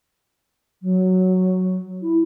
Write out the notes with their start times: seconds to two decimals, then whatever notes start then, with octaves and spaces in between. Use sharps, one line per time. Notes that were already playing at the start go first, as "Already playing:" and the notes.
0.82 F#3
2.02 E4